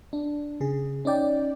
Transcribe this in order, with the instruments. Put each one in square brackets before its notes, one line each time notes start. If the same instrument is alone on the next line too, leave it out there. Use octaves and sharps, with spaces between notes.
[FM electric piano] D4
C#3 G#4
C#4 D#4 D5 G5